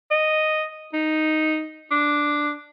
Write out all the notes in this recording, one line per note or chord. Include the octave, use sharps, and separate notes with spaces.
D#5
D#4
D4